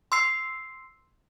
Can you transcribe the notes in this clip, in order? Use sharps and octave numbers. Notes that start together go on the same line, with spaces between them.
C6 E6 C7